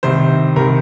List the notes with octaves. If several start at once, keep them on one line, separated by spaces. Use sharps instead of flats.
C2 C3 D#3 C5
C2 C3 D#3 A#4